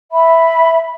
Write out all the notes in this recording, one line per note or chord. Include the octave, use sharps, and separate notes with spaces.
E5 B5